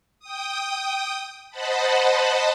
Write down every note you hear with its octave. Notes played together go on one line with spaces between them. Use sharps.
G5 D#6
C5 D#5 F#5 A5 B5